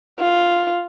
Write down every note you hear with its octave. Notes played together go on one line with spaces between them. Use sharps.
F4